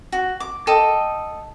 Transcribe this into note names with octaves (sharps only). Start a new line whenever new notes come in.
F#4
D6
A4 D#5 G5